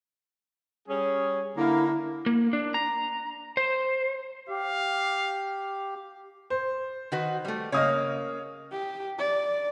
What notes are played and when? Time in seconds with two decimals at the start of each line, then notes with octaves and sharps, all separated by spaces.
0.88 G3 C#4 G#4
1.57 D3 A#3 E4 A#4
2.26 A#3
2.53 D4
2.74 A#5
3.57 C5
4.49 G4 F5
6.50 C5
7.12 D#3 F#4 B4
7.45 G3 A3
7.72 C#3 A#3 C#5 D#5 D#6 F6
8.71 G4
9.18 D5